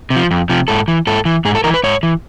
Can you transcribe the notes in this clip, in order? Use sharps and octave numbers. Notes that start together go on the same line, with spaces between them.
C3
F3
F2
C3 F3
G#2 A4
E3
G#2 A4
E3
G#2 G#4
A4
E3 A#4
B4
G#2 C#5
E3